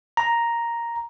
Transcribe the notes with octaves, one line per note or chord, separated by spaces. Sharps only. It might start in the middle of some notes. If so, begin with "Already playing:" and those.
A#5